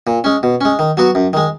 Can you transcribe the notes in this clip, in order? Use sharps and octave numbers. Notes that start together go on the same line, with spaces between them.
A#2
G#3 C#4
B2
G#3 C#4
D#3
F#3 B3 F#4
F#2
D#3 G#3